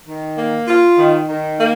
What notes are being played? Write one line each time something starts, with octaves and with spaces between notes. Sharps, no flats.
D#3
A#3
F4
D#3
D#3
A#3